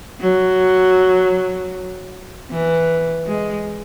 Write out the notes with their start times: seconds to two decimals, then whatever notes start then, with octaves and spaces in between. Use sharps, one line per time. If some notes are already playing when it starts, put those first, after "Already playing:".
0.20 F#3
2.51 E3
3.27 G#3